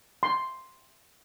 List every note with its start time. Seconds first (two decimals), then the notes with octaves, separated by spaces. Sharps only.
0.23 C6